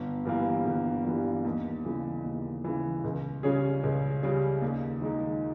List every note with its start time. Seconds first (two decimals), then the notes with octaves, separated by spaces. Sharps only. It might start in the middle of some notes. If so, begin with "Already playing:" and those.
Already playing: G1
0.25 G2 E3 G3 A#3
0.65 G1
1.05 G2 E3 G3 A#3
1.44 D#2
1.85 C#3 E3
2.24 D#2
2.64 C#3 E3
3.04 C#2
3.43 C#3 G3 C#4 G#4
3.83 C#2
4.23 C#3 G3 C#4 G#4
4.62 D#2
5.01 D#3 G#3 D#4